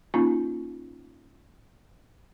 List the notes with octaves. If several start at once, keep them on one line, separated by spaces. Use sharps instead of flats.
A#3 C#4 D#4 F4